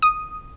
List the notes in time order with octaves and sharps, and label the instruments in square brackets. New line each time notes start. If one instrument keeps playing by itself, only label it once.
[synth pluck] D#6